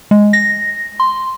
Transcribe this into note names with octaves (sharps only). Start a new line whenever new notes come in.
G#3
A#6
C6